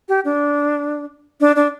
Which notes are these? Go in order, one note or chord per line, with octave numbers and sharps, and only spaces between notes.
G4
D4
D4
D4